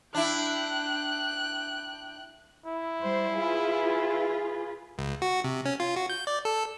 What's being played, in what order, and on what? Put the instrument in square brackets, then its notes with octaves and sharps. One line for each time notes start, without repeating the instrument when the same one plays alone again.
[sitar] D4 E4 [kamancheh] G5 F#6
[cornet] E4
[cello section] G3 C5
F4 G#4 B4
[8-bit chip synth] C#2
F#4
C3
C#4
F4
F#4
G6
D5
A4